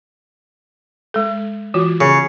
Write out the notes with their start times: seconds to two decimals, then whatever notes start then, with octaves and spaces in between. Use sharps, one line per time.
1.14 G#3 A4
1.74 E3 F4 F#4
2.01 C#3